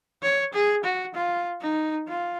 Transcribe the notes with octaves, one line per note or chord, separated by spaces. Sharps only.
C#5
G#4
F#4
F4
D#4
F4